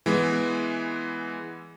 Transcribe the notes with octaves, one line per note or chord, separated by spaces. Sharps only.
E3 G#3 B3